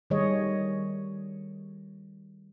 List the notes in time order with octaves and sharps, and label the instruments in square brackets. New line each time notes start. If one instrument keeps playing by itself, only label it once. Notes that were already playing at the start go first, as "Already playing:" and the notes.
[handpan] D#3 G3 A3 G#4 C#5 D#5